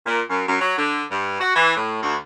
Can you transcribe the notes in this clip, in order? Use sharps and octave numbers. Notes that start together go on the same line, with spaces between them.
A#2
F#2
F#2
F#3
D3
G2
F#4
E3
A2
D2